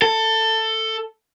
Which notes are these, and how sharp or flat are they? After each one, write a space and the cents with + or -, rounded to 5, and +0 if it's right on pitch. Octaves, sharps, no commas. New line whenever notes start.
A4 +15